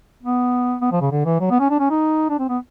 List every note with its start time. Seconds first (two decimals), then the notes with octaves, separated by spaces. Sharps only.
0.23 B3
0.82 B3
0.92 F3
1.01 C#3
1.11 D3
1.26 E3
1.40 F#3
1.51 B3
1.60 C#4
1.70 D4
1.80 C#4
1.90 D#4
2.30 D4
2.39 C4
2.49 B3